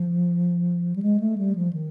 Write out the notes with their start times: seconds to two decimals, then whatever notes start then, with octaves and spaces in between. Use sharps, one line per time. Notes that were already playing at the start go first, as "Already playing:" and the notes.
Already playing: F3
0.96 G3
1.02 G#3
1.20 A3
1.38 G3
1.55 F3
1.73 D#3